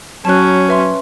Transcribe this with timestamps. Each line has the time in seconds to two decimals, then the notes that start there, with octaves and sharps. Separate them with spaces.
0.25 F#3 C#4 A5 F#6
0.68 B4 E5 C6